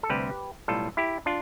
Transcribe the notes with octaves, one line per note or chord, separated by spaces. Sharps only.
A4
D2 C3 G3 G4 B4
B1 A2 G3 F4 A4
E4 G4
D4 F4